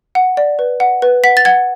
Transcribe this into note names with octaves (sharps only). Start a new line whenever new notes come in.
F#5
D5
B4
F#5
B4
F#5 B6
A6
F#5 G#6